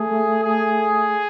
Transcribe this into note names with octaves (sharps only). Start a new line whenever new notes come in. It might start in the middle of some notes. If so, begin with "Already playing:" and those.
Already playing: A3 G#4
G#4